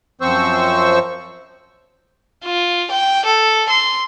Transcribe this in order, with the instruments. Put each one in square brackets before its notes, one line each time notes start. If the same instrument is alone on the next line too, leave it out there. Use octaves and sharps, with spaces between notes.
[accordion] F#2 F3 C4 C5 C#6 E6
[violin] F4
G5
A4
C6